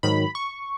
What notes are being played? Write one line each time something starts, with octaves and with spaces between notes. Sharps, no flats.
G#2 D#3 F#3 B5
C#6